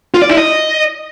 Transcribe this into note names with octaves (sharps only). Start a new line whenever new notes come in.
F4
D5
E4
D#5